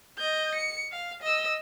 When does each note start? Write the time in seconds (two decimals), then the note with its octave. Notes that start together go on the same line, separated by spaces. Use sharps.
0.18 D#5 G6
0.55 C#7
0.92 F5
1.23 D#5 E6